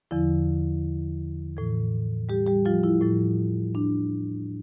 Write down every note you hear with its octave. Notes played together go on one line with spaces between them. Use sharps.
E2 D3 F3 E4
A2 E3
G3 G4
G3 G4
F3 F4
E4
A2 F3
D4